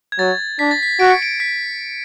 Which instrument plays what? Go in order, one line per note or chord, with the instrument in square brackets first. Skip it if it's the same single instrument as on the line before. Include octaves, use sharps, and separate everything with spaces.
[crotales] G#6
[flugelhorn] F#3 [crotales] A6
[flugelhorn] D4 [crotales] B6
[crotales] A6
B6
[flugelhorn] F#4 [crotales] D7
[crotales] C#7
D7
B6